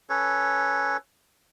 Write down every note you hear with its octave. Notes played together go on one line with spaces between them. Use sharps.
C#4 A4 B4 C#5